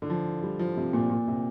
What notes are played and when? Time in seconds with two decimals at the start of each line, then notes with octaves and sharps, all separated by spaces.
0.02 D3
0.10 F3
0.43 G3
0.59 F3
0.77 C3
0.93 A#2
1.10 A#2
1.28 C3